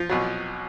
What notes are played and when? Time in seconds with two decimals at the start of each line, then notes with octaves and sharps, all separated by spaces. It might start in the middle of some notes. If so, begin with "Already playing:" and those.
Already playing: F3 F4
0.09 C2 B2 F#3